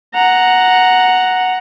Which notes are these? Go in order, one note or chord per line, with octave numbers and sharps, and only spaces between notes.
F#5 A#5